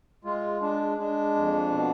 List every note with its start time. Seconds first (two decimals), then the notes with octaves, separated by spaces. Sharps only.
0.24 G#3 F4
0.61 G#3 D4
0.98 G#3 D4
1.35 F2
1.71 B2